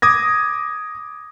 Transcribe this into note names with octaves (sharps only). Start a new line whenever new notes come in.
D6 D#6 G#6 A#6